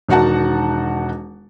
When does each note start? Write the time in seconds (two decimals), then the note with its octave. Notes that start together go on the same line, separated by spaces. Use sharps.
0.08 E1 D#3 D#4 F#4 F#5 A5